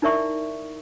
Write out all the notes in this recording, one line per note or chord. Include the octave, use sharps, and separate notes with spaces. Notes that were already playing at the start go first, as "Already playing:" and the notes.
D#4 E4 A#4 D5 E5 C#6